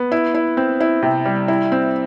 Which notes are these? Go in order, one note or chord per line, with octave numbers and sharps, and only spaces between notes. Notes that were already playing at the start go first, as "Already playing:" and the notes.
Already playing: B3
E4
E4
C4
E4
C3
G3
E4
C4